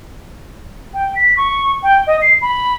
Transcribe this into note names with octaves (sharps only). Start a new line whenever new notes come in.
G5
B6
C#6
G5
D#5
C7
B5